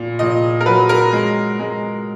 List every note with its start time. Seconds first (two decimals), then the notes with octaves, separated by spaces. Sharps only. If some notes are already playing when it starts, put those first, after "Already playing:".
Already playing: A#2
0.19 A#2 D#5
0.61 A#4
0.66 F#3 B4
0.89 A#4
1.13 G#3
1.60 G#3